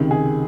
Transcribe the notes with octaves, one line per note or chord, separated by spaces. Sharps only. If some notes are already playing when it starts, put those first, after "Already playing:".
Already playing: C#2 C3 D#3
G#4